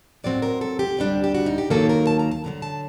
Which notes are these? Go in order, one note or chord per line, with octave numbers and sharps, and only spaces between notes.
A2 F#3 C4 D5
A#4
A4
G4
D2 C3 G3 D4
G4
F#4
D#4
G4
D#2 D#3 F#3 A#3 A4
A#4
A5
A#5
A5
F#2 D3 F#3 A#5
A5